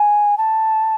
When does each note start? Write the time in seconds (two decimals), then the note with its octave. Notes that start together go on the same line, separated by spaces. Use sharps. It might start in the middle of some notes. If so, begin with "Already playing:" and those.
Already playing: G#5
0.38 A5